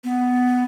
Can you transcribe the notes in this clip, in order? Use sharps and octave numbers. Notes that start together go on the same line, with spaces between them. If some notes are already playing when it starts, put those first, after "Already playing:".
B3